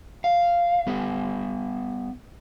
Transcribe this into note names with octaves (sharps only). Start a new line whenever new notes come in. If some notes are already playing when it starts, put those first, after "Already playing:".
F5
G3 B3